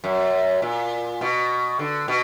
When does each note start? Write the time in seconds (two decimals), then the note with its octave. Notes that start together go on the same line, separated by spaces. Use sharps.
0.04 F#2
0.62 A#2
1.21 B2
1.79 D3
2.08 B2